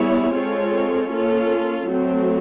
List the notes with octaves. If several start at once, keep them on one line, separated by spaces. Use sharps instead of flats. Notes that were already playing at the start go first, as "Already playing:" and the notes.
Already playing: G3 B3 E4 G#4 C#5
G#3 C4 F4 A4 C#5
A#3 C#4 F4 A4
F#3 A3 C4